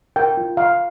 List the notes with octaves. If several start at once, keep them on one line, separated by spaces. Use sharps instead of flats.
A#4 G5
F4
F4 F5